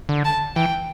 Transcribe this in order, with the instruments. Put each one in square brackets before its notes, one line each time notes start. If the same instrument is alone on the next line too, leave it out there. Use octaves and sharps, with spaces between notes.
[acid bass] D3
[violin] A5
[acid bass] E3 [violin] G5